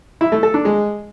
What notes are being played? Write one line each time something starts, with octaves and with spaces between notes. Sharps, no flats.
E4
A3
A4
D4
G#3